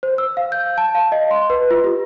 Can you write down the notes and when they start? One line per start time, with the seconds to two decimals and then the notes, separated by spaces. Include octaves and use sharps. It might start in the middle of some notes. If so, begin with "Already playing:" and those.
0.03 C5
0.18 E6
0.37 F5
0.52 G6
0.78 A5
0.95 F5
1.12 D#5
1.31 C6
1.50 B4
1.71 F4
1.84 G4